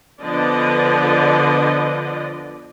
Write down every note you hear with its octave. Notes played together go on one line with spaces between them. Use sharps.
D3 F3 B3 D5 D#5